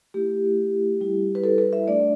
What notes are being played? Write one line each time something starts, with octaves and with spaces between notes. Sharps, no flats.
A3 E4 G4
G3 E4
B4
A4
B4
E5
A3 D4 D5